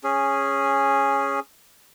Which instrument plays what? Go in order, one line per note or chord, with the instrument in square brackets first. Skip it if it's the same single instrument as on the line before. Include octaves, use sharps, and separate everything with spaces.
[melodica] C#4 G#4